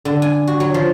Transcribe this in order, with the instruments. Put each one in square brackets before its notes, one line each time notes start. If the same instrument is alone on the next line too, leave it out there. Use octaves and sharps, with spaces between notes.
[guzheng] D3
G#5
F#4
F#3
F3